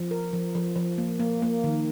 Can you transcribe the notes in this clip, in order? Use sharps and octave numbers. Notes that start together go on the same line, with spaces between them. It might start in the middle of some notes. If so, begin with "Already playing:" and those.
Already playing: F3
A#4
F3
F3
F3
A#3
A#3
A#3
D#3